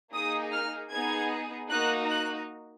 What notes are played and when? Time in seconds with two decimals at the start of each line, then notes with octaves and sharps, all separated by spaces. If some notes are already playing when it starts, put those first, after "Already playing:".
0.13 A#3 D#4 G#4 D#6
0.53 F6
0.92 B3 D#4 G#4 G#6
1.70 A#3 D#4 F#4 F#6
2.10 F#6